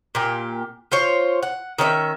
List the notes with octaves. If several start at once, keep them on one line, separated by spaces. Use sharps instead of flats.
A#2 G4
F4 C5 C#5
F#5
D#3 C#4 D#5 E5